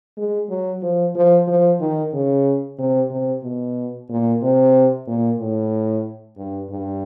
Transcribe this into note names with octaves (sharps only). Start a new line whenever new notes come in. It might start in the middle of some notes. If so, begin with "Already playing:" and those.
G#3
F#3
F3
F3
F3
D#3
C#3
C3
C3
B2
A#2
C3
A#2
A2
G2
G2